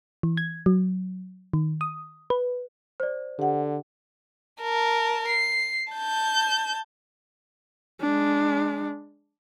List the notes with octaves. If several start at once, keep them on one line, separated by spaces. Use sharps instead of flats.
E3
G#6
F#3
D#3
D#6
B4
C5 D5
D3 G4 F#5
A#4 A5
C7
A5 G6
G#3 D4